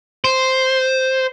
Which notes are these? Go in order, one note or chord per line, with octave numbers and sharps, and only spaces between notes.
C5